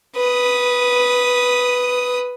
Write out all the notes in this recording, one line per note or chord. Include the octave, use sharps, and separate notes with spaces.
B4 D#6